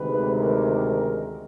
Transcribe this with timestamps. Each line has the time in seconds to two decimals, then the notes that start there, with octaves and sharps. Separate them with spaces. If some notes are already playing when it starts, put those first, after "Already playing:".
Already playing: D2 C3 D#3 G#3 B4
0.33 A#4